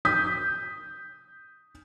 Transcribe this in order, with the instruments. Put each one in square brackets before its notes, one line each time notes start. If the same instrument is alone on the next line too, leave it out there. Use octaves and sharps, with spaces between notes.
[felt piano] D#6 G6 B6